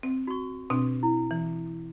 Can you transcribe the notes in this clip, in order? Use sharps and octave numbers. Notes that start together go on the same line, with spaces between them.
C4
F#4 C#6
B2 C4 D4
E4
E3